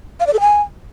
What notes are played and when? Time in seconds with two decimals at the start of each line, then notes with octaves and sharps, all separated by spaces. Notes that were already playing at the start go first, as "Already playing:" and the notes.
0.20 F5
0.27 D5
0.33 A4
0.40 G#5